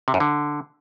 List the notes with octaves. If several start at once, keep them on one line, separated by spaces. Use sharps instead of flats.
C3
F#2
D3